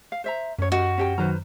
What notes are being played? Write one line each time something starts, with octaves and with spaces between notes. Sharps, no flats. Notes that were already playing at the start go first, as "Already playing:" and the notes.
F5
C5 E5 A#5
F#2 C#4 C#5
F#4 D#5
C#4 G4 G5
D#3 F#3 B4 C5 A#5 F6